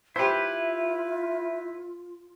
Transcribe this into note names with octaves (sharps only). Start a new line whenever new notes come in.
E4 F4 G4 B4 C5 E5